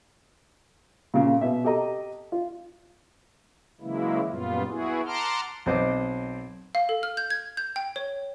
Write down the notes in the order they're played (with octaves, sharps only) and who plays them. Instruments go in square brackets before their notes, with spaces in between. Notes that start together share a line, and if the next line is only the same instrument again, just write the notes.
[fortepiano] A#2 C#3
B2 E5
G4 A4 D#5 A#5
F4
[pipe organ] C#3 E3 F#3 G#3 A#3 E4
F#2 A#2 G3 B3 F4
B3 E4 F#4 G#4
F#5 A5 A#5 C6 D6 F6
[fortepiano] B1 C4 C5 D#5 D6
[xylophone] F5
A4
F6
G6
G#6
G6
G5
C#5